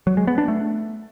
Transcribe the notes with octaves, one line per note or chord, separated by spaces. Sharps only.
F#3
G#3
B3
D4
A3